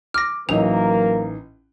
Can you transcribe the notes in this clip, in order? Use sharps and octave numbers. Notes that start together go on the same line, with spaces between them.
D6 F6 A#6
A1 F#3 A#3 D#4 A#4 E5 F7